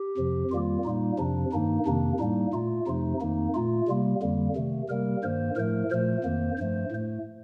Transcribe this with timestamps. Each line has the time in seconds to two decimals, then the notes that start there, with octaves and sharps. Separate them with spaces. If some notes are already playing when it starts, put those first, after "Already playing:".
Already playing: G4
0.17 F2 C3 F3
0.51 F2 D#3 G3 A#3 F4
0.84 A#2 G3 A#3 D#4
1.18 F2 C3 F3 D4
1.52 G2 D#3 A#3 D#4
1.86 F2 C3 D#3 A#3 D4
2.19 A2 G3 A#3 D#4
2.53 A#2 A3 F4
2.87 F2 C3 F3 A3 D#4
3.21 F2 D#3 A#3 D#4
3.54 A#2 A3 F4
3.88 C3 G3 A#3
4.22 F2 D3 G3 A#3
4.56 C3 D#3 A3
4.89 C3 G3 A#3 A#4
5.23 G2 D#3 A#3 C5
5.56 A2 F3 A3 A#4
5.91 A#2 F3 A3 C5
6.24 F2 D#3 A#3
6.58 G2 F3 A3 C5
6.91 A2 A3